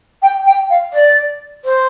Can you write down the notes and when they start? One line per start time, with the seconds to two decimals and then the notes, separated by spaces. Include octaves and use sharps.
0.22 G5
0.46 G5
0.70 F5
0.93 D5
1.65 C5